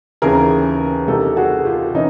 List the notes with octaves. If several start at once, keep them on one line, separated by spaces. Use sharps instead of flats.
D#2 C#3 E3 G#4 A#4
C2 C3 D#3 G4 A4
F#4 G#4
F4 G4
E3 C#4 D#4